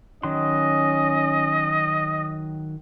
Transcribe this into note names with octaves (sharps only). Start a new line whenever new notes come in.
D#3 F#3 C#4 D#5 C6